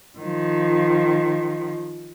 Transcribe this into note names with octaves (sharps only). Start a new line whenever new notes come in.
D#3 F3